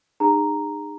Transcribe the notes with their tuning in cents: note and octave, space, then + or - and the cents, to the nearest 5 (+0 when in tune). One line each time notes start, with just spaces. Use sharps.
D#4 -35 G#4 -35 A#5 +0